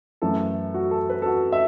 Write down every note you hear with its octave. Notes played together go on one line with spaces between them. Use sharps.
F#2 E3 A3 A4
F#4
A4
B4
A4
F#4
E5